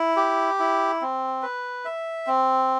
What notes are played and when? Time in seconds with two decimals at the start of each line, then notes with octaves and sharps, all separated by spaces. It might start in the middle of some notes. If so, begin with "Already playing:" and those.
Already playing: E4
0.17 G4
0.59 E4
1.01 C4
1.42 B4
1.85 E5
2.27 C4